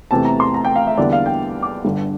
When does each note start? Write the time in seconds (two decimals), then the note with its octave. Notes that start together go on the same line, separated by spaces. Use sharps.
0.11 E2 C3 E3 A3 A5
0.25 A#5
0.40 C6
0.54 A#5
0.65 G5
0.76 F5
0.87 E5
0.98 E2 D3 G3 A#3 E4 D5
1.13 F5
1.26 G5
1.62 D6
1.85 G1 G2 D3